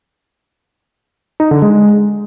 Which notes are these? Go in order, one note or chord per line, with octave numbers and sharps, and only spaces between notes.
D#4
D3
G#3